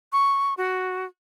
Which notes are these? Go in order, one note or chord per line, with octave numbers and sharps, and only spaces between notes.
C#6
F#4